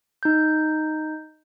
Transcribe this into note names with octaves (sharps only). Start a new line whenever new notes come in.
D#4 G6